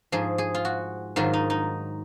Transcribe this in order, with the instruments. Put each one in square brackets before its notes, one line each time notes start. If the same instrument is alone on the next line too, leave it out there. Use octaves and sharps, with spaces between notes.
[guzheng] G#2 F3 G#4
G#4
F4
F#4
G#2 D#3 F#3 F4
D#4
D#4